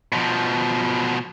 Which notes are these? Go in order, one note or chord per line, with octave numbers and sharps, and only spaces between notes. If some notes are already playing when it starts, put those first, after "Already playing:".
B2 F3